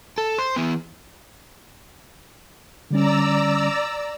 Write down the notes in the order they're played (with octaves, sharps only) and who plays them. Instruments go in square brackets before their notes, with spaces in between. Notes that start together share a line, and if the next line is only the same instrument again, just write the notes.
[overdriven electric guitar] A4
C5
E3 B3
[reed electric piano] D3 G3 C#4 [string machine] D5 A#5 E6